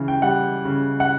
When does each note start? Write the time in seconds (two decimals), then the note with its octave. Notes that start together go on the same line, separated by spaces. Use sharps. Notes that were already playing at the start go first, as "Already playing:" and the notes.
Already playing: C#3 E3
0.08 G5
0.22 G3 F#5
0.65 C#3
1.00 F#5